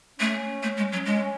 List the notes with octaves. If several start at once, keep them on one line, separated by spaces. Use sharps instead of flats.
A3 C#4
A3
G#3
F#3
G#3 C#4